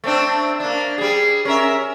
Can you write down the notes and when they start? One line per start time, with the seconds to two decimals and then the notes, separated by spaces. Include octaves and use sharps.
0.04 A3 C4 D4
0.60 A#3 D4
0.98 G3 G#4
1.45 C#4 A#4 E5